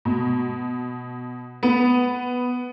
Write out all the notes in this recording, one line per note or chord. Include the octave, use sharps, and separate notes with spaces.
B2
B3